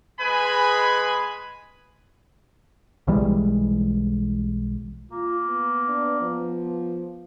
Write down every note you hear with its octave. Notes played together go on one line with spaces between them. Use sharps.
G#3 G#4 B4 G#5 B5
B1 E3 G3 G#3
A#3 F4
B3
D4
F3